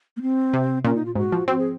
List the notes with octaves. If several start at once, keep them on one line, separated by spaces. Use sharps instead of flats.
A#3
C4
C3
A#2 C#4
D#4
F4
G#2 F#4
F3
C4 F#4
G#4